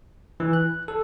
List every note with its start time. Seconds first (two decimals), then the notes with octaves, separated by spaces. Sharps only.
0.40 E3
0.53 F#6
0.88 A4